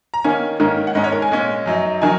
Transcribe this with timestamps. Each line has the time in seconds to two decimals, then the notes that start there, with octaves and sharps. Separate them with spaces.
0.14 A#5
0.24 D#3 A#3 C#4 G#5
0.60 G#2 D#3 A#3 C#4
0.87 F#5
0.95 G#2 G#3 C#4 D#5
1.04 C#5
1.12 A#4
1.22 G#5
1.31 A#2 G#3 C#4
1.66 F#2 F#3 D#4
2.01 D#3 F#3 D#4 G#5